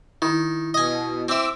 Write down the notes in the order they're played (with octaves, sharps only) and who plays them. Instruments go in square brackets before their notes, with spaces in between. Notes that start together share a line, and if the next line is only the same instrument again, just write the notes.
[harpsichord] D#3 [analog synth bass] E4
[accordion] B2 [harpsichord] D#5 G#5
[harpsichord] C4 E5 [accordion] D6 E6